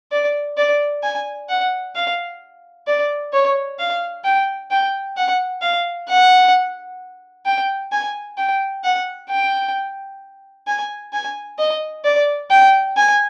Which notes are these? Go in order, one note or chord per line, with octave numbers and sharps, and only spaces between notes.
D5
D5
G#5
F#5
F5
D5
C#5
F5
G5
G5
F#5
F5
F#5
G5
G#5
G5
F#5
G5
G#5
G#5
D#5
D5
G5
G#5